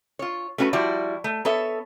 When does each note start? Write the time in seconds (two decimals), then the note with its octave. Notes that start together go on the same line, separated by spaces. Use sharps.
0.19 F4 C#5
0.58 A3 C#4 F#4 G#4 B4
0.73 F3 G3 E4 F#4 D5
1.24 A3
1.45 B3 A4 C#5 E5